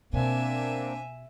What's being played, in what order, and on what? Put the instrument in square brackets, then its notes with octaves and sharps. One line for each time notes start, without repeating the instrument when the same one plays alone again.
[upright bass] B2 [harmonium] A#3 C4 D4 [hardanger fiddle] E5 G#5